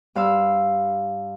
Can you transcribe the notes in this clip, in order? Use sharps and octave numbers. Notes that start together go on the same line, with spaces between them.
G2 F5 C6 E6